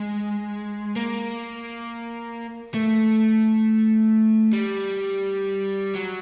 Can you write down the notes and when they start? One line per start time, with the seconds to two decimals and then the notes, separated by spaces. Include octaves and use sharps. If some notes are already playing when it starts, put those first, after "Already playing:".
Already playing: G#3
0.96 A#3
2.74 A3
4.53 G3
5.95 F#3